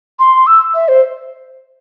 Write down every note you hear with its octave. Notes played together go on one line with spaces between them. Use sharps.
C6
E6
E5
C5